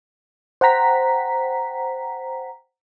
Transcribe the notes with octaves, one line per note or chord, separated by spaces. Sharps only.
C5 F#5 G5 A#5 B6